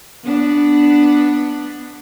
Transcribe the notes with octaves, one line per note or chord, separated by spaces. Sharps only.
B3 D4